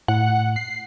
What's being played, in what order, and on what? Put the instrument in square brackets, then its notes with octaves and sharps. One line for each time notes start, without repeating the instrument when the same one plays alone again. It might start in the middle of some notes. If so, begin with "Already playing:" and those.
[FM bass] A2 [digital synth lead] F#5
[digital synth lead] C7